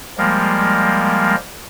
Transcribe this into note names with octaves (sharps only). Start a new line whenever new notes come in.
F3 G3 G#3 A#3